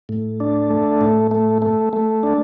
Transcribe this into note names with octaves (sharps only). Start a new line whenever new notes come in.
A2
D4
A3
A2
A3
A3
A3
D4